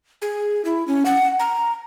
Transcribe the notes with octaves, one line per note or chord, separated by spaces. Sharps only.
G#4
E4
C#4
F#5
A#5